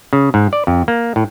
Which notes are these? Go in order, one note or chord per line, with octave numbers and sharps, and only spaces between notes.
C#3
G#2
D5
F2
A#3
A2